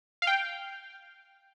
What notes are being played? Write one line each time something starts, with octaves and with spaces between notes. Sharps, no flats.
F5
G5